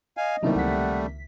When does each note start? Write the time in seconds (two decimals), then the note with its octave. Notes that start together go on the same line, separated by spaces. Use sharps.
0.17 D#5 F5 G#5
0.43 C3 D#3 F#3 G3 A3 A#3 D#4 E4
0.55 C#2 F#5 B6